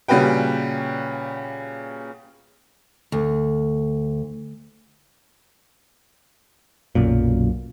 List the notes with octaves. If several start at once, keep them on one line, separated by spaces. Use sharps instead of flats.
A#2 C#3 G3 F#4 B4 G5
D2
B1 F#2 A#2